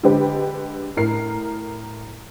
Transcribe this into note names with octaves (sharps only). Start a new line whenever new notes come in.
D3 G#3 G4 B4
A2 A#4 C7